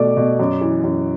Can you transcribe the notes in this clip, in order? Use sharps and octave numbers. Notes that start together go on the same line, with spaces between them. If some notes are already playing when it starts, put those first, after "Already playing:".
Already playing: B2 A3 D5 D6
B2
F#2
E3
F#2